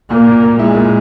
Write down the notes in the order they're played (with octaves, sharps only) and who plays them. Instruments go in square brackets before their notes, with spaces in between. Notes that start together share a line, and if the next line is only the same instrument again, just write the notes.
[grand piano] A#2 [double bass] A#3
[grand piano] A#2
A#2
[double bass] G#3 [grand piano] E4
[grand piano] A#2